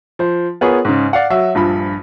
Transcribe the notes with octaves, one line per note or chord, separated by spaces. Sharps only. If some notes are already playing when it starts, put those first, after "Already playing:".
F3 C5
B3 F4 G#4 A#4 B4 C#5
G#2 C#3
D5 F5 F#5
F#3 F#4 E5
A#1 G2 F3 B5